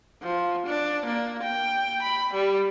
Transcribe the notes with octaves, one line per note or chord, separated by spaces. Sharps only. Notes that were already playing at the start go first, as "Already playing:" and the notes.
F3
D4
A#3
G5
B5
G3